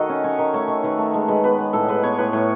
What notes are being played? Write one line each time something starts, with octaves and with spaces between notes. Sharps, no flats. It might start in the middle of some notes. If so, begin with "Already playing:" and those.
Already playing: D#3 A3 F#4 A4 D#5
C#4
C#4 C#5
D#3
A3 C#5
D#3
D#3 B4
A3
G#3 A4
G#3 B4
B3 B4
B3
A2 A4
G#3 B4
B3 C#5
A2 B4
A2 C#5